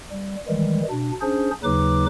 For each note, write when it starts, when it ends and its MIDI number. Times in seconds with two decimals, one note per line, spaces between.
0.12 0.36 55
0.49 0.83 51
0.49 0.83 52
0.49 0.83 55
0.49 0.83 56
0.90 1.12 47
0.90 1.12 62
1.21 1.51 61
1.21 1.51 62
1.21 1.51 68
1.21 1.51 72
1.64 2.06 39
1.64 2.06 49
1.64 2.06 54
1.64 2.06 63
1.64 2.06 71
1.64 2.06 86